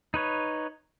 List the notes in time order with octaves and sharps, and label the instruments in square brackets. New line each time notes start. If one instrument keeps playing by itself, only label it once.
[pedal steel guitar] D#4 B4 C#5